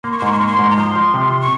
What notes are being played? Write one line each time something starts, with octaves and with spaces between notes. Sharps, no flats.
A#3 C6
C#6
C6
G#2 C#6
C6
A#3 C#6
C6
G#2
A#5
F3 C6
F3
C3
C#6